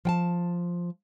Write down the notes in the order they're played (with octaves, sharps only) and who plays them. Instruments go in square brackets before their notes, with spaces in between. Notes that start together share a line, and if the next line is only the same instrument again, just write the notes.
[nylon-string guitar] F3 G5 A5